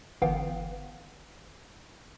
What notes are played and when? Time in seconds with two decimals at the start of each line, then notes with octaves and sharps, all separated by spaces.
0.22 G1 E3 B3 F5 G5